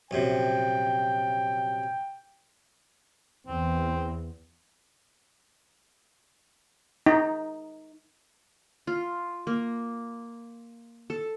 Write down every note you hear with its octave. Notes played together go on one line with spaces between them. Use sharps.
A#1 F#2 C3 G5
E2 C4
D#4
F4
A#3
A4